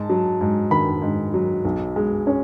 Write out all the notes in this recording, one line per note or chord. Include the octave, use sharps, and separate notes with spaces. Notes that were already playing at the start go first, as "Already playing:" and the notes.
Already playing: G#2 A5
F#3
G#2
D#3 B5
G#2
F#3
B1
G#3
C#4